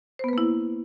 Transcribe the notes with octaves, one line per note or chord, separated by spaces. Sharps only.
A#3 B3 E4 B4 C5